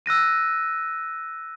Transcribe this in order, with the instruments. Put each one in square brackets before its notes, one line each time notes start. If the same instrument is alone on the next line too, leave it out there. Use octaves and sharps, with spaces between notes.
[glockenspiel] E6 F#6 A#6 D#7